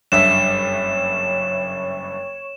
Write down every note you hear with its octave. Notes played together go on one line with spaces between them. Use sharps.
F#1 G2 C#5 E5 E7